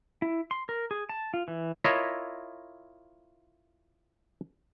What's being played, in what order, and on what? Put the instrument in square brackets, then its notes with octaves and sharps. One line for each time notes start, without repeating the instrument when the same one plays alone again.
[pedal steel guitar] E4
C6
A#4
G#4
A5
F4
E3
[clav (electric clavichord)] E4 F4 A#4 C#5 D#5 E5